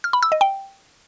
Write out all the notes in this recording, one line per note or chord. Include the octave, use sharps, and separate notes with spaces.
F6
B5
E6
D#5
G5